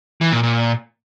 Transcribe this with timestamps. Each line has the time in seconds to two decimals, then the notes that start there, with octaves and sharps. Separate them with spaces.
0.21 E3
0.32 A#2
0.43 A#2